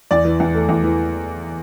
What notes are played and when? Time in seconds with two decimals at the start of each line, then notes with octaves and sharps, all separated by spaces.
0.11 E2 D5
0.25 E3
0.40 E2
0.54 A3
0.69 E2
0.83 E3